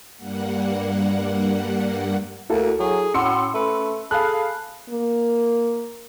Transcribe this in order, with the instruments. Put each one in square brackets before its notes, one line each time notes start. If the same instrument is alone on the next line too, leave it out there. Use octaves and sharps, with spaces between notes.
[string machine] G2 G3 A#3 F#5
[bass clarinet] D2 [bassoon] A#3 [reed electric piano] E4 F#4 A4
[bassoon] F#3 [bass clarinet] G#4
[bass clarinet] A2 [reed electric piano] C#4 [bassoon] F#4 [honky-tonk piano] C6 E6 C#7
[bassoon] A3 [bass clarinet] B4
[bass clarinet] G#4 [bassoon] A4 [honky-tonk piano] F5 F#6 [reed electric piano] A5 B5
[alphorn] A#3